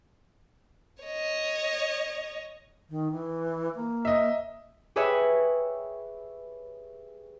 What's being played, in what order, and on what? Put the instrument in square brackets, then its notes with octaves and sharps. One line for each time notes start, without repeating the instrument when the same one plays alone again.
[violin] C#5 D#5
[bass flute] D#3
E3
A#3
[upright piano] D#5 E5
[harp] G4 G#4 B4 C#5 E5 G#5